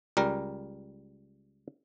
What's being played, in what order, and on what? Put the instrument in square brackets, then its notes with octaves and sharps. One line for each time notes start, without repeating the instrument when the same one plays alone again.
[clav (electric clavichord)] C#2 G3 A#4